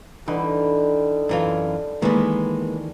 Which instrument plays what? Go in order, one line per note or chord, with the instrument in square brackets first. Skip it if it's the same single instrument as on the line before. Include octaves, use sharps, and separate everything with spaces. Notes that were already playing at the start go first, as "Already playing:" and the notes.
[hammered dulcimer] D3 G3 D#4 [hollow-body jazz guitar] E3
[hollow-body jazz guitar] F#2 E3 F4
[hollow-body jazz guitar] D#3 E3 [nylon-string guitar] G#3 A#3 B3